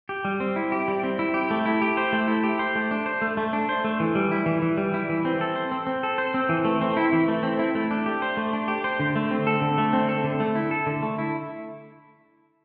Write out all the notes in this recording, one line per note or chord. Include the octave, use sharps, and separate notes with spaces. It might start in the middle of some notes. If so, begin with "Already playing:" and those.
G4
G3
C4
E4
G4
G3
C4
E4
G4
A3
E4
G4
C5
A3
E4
G4
C5
A3
D4
C5
A3
A3
D4
C5
A3
E3
G3
E4
E3
E3
G3
E4
E3
C4
A4
C5
C4
C4
A4
C5
C4
E3
A3
C4
E4
E3
A3
C4
E4
A3
D4
G4
C5
A3
D4
G4
C5
D3
A3
C4
A4
D3
A3
C4
A4
D3
A3
E4
A4
D3
A3
E4